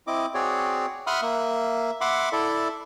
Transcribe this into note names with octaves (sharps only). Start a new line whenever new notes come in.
C4 E4 D#5 D6
C4 F#4 G#4 C#5 D5
E5 F#5 B5 C6 D#6 F6
A#3 E5
E5 F#5 B5 C6 D6
E4 A4 D5 E5